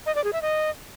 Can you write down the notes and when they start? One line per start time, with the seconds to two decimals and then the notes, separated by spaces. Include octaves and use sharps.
0.06 D#5
0.15 D5
0.24 G#4
0.33 E5
0.42 D#5